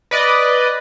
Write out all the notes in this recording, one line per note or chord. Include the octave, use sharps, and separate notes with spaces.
B4 D5 D#5